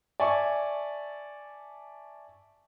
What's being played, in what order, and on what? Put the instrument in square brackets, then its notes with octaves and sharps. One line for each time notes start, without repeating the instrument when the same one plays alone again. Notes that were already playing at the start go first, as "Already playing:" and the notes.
[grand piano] D5 E5 G#5 A5 C#6